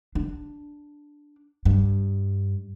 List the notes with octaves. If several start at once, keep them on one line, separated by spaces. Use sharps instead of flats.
D4
G2